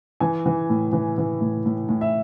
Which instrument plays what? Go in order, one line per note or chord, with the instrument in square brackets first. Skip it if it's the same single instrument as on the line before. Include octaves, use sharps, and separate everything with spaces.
[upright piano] E3 G#5
E3
A2
E3
E3
A2
A2
A2
E5